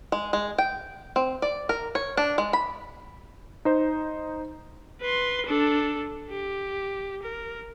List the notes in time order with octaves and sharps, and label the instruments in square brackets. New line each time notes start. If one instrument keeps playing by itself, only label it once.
[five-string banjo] G#3
G#3
G5
C4
D5
A#4
C#5
D4
G#3
B5
[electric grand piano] D#4 C5
[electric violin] B4 C6
D4 A4
G4
A#4